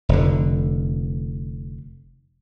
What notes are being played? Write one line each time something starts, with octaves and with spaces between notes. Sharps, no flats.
F1 D3